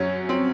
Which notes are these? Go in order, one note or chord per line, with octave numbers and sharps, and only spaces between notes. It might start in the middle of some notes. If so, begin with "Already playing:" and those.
Already playing: F#2 F#3 C#4
C4